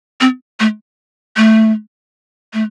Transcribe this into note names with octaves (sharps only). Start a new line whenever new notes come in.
C4
A3
A3
A3